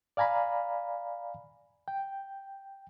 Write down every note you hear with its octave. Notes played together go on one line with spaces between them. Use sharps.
D5 F5 G#5 A#5 B5
G5